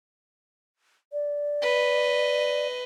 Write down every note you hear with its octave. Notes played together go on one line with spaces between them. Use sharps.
D5
B4 D#5